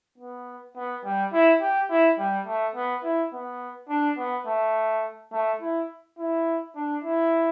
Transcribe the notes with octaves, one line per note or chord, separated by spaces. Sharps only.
B3
B3
G3
E4
G4
E4
G3
A3
B3
E4
B3
D4
B3
A3
A3
E4
E4
D4
E4